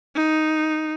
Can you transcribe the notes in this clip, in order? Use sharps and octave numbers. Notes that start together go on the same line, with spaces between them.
D#4